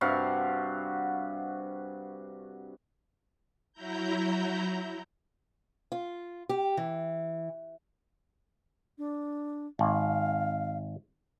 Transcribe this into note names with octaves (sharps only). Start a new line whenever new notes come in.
G2 C3 F#4 F5
F#3 E4 A#5 G6
F4
G4
E3
D4
G#1 F5